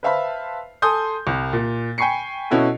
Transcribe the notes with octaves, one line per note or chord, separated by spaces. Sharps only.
B4 C5 E5 F5 A5 B5
A4 G#5 C6 D#6 G6
C2
A#2
G5 G#5 B5 C#6 C7 C#7
B2 C#4 E4 F#4 A4